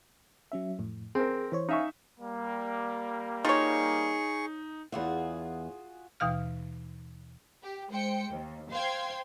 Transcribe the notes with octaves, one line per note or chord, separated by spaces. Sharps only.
F#3 C#4 E5
F2 A2
C4 G#4 A#4
E3 C5 C#5
D#4 E5 F5 G#5 C#6
G3 A#3
D#4 F4 G#4 C#5 C#6
E2 F4 F#4 G#4 E5
D#2 B2 E3 F5 F6
G4
G#3 C5 G5 C#7
D#2
C5 F5 G5 C6 G#6